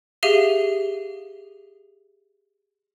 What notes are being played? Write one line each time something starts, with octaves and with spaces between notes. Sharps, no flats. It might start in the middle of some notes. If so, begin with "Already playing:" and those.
G4 G#4 E5 F5 D#7 G7